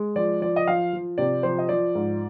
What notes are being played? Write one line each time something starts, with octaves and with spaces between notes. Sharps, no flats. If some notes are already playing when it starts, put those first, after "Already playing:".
Already playing: G#3
F3 D5
F3 D5
D#5
F3 F5
F3
C3 D5
F3 C5
D#5
F3 D5
G#2